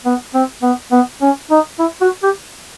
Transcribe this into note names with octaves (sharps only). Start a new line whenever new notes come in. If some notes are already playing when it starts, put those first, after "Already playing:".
B3
C4
B3
B3
C#4
D#4
E4
F#4
G4